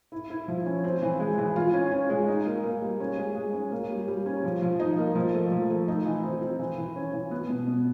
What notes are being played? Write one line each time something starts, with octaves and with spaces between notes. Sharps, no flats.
E4
E4
F3
C#4
C4
E3
G#3
E3
F4
C#4
C#4
G#3
D#4
A#3
A#3
G3
C#4
G#3
G#3
C#4
A#3
G3
G3
C#4
F3
F3
D#4
A#3
F3
A3
F3
A3
D#4
E3
C4
C4
E3
E3
C#4
E3
B3
B2
B2